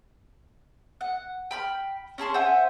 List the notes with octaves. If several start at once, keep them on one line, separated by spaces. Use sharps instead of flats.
F#5
G5 B5 F6
C#4 G#4 A5 C6
C5 E5 F#5 G#5